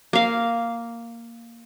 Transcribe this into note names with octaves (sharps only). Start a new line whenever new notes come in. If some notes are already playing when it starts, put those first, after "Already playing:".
A#3 F5